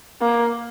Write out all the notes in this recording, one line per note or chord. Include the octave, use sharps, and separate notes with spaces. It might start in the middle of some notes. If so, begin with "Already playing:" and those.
A#3